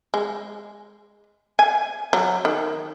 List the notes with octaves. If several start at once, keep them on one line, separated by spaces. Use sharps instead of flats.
G#3
G#5
F#3
D#3